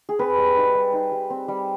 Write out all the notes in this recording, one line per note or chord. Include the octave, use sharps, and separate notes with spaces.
G#4
C4 B4
G3
D#4
G3
D#4
G3
C4
G3